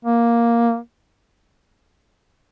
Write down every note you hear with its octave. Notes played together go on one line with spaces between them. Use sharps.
A#3